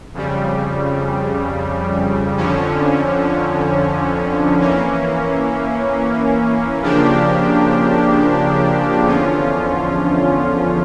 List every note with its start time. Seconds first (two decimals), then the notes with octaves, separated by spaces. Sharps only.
0.14 F2 C#3 G3
2.38 F2 D3 F3 C#4
4.60 E3 A#3 C#4
6.83 C#3 F3 A#3 D4 G4
9.05 E2 D3 F3 C#4 F4